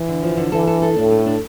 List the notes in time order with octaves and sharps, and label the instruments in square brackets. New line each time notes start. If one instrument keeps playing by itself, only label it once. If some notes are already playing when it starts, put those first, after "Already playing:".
Already playing: [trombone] E3
[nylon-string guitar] D3
F3
D3
[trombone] E3 [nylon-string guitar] A4
[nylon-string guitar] A4
A4
[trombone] A2 [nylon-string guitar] D4
[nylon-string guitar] A3
D4